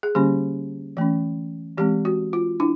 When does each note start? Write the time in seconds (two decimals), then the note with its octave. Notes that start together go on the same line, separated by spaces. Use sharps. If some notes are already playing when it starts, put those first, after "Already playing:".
0.03 G#4
0.15 D3 G3 A#3 C#4 G4
0.97 E3 A3 C#4
1.78 E3 G#3 C4 G4
2.05 F#4
2.33 F4
2.60 D4 E4